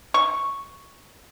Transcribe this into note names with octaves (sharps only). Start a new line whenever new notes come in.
C#6